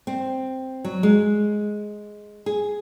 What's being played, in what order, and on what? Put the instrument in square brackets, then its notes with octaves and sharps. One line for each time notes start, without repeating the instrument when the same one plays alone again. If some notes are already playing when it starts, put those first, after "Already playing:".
[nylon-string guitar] C4
F#3
G#3
G#4